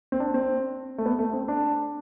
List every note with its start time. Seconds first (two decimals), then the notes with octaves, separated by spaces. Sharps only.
0.12 C4
0.20 D4
0.34 C4
0.98 A3
1.06 B3
1.19 A3
1.33 C4
1.48 D4